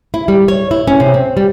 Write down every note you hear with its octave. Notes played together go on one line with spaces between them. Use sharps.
E4
G3
C#5
E4
C#4
C3
C4
G3